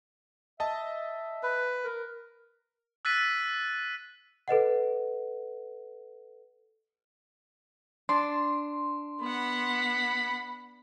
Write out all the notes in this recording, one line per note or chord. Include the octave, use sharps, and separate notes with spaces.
D#5 E5 A5
B4
A#4
E6 F#6 A6 B6 D#7
A4 B4 D#5 F#5
D4 C6
B3 F#5 B5